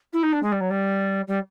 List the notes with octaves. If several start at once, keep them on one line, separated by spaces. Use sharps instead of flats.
E4
D#4
D4
G#3
G3
F#3
G3
G3